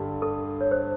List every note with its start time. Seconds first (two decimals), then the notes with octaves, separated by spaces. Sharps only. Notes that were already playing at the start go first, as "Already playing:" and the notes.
Already playing: G2 D3 G3
0.22 A4
0.61 C#5
0.71 C5